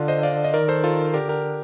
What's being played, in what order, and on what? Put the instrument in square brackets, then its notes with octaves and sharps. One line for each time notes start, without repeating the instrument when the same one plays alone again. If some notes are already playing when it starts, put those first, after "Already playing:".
Already playing: [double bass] D3 [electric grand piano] F4
[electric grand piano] C5 D#5
D5 F5
D#5
[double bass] D#3 [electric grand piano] A#4 D5
[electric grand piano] A4 C5
F4 A4
[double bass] D3 [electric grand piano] G4 A#4
[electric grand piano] G4 A#4